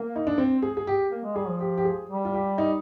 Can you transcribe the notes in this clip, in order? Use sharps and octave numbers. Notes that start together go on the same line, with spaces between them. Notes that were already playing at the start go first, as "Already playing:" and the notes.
Already playing: A#3
D#4
D4
C4
G#4
G#4
G4
A#3
G#3
G3 G#4
F3
G4
G4
G#4
G3
F4
G4
D#4